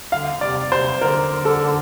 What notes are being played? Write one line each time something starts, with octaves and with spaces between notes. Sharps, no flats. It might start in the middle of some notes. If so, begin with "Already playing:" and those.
D3 F5
C3 D5
C3 C5
D3 A#4
A4